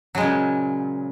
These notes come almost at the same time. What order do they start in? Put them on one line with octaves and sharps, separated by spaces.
F#3 G#3 C#3 A#2